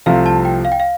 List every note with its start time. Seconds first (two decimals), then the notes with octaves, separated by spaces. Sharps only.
0.06 C2 C3 F3 A3 C4 F5
0.26 A5
0.45 G5
0.65 F5
0.72 G5
0.80 F5